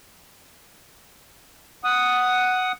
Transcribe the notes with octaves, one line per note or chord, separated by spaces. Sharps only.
F#5 D#6